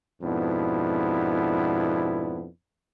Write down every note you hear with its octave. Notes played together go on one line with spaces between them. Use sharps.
F2 G#2 B2 B3 D4 E4